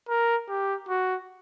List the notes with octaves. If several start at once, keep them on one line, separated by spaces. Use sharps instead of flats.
A#4
G4
F#4